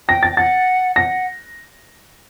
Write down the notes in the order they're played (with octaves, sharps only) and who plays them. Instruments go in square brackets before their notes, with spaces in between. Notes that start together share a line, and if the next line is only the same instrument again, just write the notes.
[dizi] G5 [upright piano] A#6
[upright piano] A6
[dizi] G5
[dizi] F#5 [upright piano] A6
[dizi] F#5 [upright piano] A#6